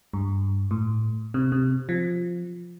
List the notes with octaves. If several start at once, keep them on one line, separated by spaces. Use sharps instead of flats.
G2
A2
C3
C3
F3